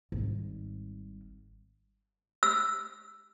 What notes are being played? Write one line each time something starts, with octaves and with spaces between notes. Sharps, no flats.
G#1 G3
E6